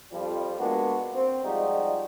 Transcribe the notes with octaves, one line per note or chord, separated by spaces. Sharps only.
F2 F3 G3
G#3 A#3 B3 D4 F#4
C4
F3 G3 G#3 D#4 F4 F#4